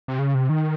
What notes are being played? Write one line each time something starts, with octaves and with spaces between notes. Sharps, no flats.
C3
C#3
C3
D#3